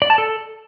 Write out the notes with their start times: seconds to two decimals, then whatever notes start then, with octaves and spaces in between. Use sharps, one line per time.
0.02 D5
0.10 A5
0.18 A4